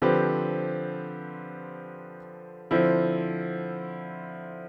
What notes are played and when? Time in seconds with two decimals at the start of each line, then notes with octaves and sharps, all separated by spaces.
0.02 D3 F3 C4 G4 B4
2.71 D3 F3 C4 E4